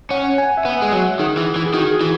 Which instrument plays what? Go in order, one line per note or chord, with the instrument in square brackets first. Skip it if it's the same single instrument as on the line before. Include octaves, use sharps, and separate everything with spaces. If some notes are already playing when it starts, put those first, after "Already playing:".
[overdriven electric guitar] C#4 [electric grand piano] F#5
[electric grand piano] G#5
E5
[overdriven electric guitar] B3 [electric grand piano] F#5
[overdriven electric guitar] G#3
F#3
[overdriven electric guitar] D#3 [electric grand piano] G#4
[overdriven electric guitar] E3
E3
[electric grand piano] G#4
[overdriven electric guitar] D#3 [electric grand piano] F#4
[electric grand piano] G#4
[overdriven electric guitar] E3